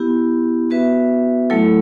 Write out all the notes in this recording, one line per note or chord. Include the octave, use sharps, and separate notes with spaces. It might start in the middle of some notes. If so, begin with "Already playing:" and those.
Already playing: B3 E4 G4
B3 F#4 B4 E5
F#3 A3 E4 A4